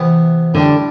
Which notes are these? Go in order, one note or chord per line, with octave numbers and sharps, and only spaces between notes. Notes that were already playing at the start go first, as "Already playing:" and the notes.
Already playing: C3 E3 B3
A2 D3 G3 D4 G4